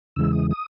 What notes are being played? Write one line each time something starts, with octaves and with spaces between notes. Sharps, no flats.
E2 C#3 E3 G#3 E6
D#6
D#6